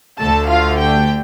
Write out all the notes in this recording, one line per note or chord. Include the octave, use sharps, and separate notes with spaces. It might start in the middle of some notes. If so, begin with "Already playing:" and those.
D2 D3 A3 A4 A5
F4 F5
G4 G5